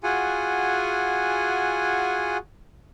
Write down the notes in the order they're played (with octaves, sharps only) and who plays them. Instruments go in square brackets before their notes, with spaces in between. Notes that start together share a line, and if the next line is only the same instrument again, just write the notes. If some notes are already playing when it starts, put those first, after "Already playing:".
[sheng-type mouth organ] F4 F#4 G#4 F#5 G#5